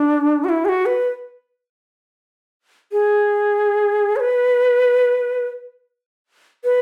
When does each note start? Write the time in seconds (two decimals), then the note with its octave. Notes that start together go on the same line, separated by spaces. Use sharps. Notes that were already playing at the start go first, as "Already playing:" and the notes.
Already playing: D4
0.44 F#4
0.49 E4
0.65 G#4
0.69 F#4
0.86 B4
2.92 G#4
4.16 C#5
4.20 B4
6.64 B4